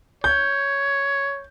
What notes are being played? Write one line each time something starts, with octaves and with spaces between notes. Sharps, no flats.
C#5 G6